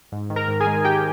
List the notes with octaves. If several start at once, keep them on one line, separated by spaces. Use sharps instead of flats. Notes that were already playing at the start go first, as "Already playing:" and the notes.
G#2
D#3
A#4 A#5
G#2
G#4 G#5
G#3
G#2 G4 G5